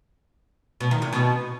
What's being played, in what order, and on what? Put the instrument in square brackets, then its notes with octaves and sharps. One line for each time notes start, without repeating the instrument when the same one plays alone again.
[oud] B2
D#3
C3
B2